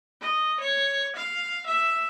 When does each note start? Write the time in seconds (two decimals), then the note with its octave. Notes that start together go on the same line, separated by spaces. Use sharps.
0.21 D#5
0.61 C#5
1.16 F5
1.67 E5